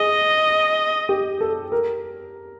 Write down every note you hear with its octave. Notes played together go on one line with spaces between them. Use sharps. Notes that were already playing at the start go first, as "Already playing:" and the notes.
Already playing: G#4 D#5
G4
A4
A#4